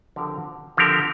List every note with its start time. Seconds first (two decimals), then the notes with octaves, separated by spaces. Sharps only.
0.16 D3 F3 C4 G4 A#4
0.77 D3 F3 C4 G4 A#4